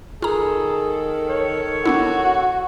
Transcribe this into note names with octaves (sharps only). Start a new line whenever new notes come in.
D#3 F4 G#4 A4 A#5
C#5
B3 D4 E4 F#4